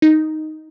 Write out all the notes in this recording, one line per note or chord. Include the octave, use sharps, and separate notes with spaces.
D#4